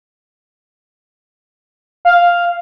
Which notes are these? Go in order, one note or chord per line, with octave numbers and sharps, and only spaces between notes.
F5